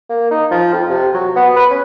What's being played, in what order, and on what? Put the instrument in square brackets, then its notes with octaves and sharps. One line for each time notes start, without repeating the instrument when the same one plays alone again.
[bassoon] A#3
D#4
F3
F2
C3
F#3
B3
B4
C#4